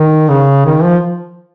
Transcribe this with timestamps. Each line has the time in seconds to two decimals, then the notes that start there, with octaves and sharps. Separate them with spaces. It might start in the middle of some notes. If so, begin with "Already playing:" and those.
Already playing: D#3
0.30 C#3
0.66 D#3
0.84 F3